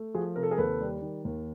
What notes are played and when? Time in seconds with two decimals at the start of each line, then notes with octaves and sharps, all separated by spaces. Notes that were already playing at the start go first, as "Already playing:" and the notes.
Already playing: A3
0.14 F3 F#4 G#4
0.36 C3 A#4
0.43 A4
0.51 G#4 A#4
0.58 D#2 A4 B4
0.80 G3
1.02 D#3
1.25 D#2